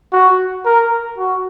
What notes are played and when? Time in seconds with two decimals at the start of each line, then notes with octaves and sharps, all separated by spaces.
0.12 F#4
0.65 A#4
1.18 F#4